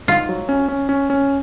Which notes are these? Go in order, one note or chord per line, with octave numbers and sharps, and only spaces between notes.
G#2 F4
F#3
C#4
C#4
C#4
C#4